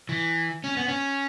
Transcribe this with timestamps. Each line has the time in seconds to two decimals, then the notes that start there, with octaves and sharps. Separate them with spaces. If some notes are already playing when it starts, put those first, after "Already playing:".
0.09 E3
0.64 C#4
0.77 B3
0.88 C#4